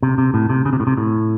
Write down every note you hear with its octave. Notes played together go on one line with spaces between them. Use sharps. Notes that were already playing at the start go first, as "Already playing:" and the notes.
C3
C3
A2
C3
C#3
C3
A2
C3
A2